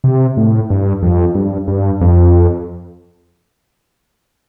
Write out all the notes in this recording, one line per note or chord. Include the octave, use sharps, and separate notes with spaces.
C3
A2
G2
F2
G2
G2
F2